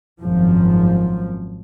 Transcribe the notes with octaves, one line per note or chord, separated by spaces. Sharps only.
G#1 F#2 F3